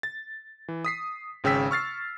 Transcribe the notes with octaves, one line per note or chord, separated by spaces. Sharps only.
A6
E3
D#6 B6 C7
G#1 C#3 G5 E6 B6
C#6 F6 A6 C7